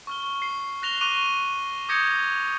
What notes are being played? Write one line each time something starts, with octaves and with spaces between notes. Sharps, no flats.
C#6 F6 G7
C7
F#6 A#6 F7 G7
C#6 D6 F#6 D#7 F7 G7
D6 D#6 G6 G#6 A#6 C#7